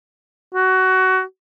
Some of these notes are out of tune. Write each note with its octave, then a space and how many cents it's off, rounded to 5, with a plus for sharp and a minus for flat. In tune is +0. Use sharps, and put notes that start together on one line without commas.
F#4 +20